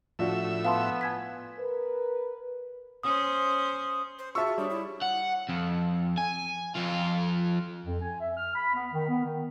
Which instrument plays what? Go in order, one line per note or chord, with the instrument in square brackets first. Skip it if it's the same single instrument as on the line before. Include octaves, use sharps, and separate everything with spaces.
[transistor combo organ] A2 E5 [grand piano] F3 D4 F#4
[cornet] B3 [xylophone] F5 A5 C6
[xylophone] G#5 G#6 B6
[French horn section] A#4 B4
[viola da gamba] C#4 C5 [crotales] D#6
[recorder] C5
[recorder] F4 [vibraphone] F#4 G#4 [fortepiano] E5 E6 [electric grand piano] A5 C#6
[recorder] F4
[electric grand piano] G3 [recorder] D4 [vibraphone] C#5 D#6
[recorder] E4 [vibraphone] C#6
[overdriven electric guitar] F#5
F2
G#5
F2 F4
[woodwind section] F2
G#5
E5
F6
B5
B3
D#3
B3
D#3